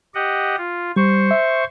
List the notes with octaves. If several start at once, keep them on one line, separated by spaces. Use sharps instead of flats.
G4 D#5 F#5
F4
G3 C5 C#6
E5